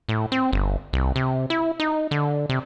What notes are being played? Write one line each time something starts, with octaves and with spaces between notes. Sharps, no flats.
A2
C4
G1
C2
C3
E4
D#4
D3
C3